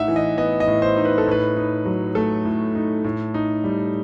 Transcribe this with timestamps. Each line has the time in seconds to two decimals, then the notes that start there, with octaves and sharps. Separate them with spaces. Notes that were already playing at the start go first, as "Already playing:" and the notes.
Already playing: A2 D#4 E5 F#5
0.08 E3
0.16 D#5
0.38 B3 D#5
0.60 D#5
0.67 A2
0.82 C5
0.97 D#4
1.05 B4
1.18 A4
1.27 A2 B4
1.57 D#4
1.86 F#3
2.15 A3 A4
2.45 A2
2.75 D#4
3.04 A2
3.34 D#4
3.64 G3